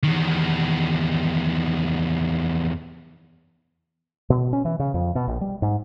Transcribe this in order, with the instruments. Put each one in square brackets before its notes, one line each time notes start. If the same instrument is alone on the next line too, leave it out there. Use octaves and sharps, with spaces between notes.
[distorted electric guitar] E2 D#3
[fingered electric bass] B2
C#4
E3
C#3
F2
B2
A#1
G3
G#2